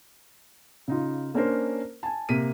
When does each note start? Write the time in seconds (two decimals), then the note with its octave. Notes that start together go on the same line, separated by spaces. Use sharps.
0.88 C#3 D#4 F4
1.34 A#3 C#4 D4 A#4 C5
2.03 G#5 A5
2.29 C3 A#3 B6 D#7